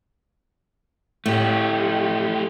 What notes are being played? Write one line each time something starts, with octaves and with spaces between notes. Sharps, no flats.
A2 A3 G4